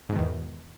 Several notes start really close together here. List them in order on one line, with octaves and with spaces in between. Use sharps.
G#2 B2 D#3 E2